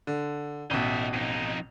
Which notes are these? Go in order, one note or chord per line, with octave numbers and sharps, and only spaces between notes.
D3
A1 B2 D#4 E5
F2 D#4